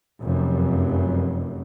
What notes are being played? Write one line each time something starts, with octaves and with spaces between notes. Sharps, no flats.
F1 F#2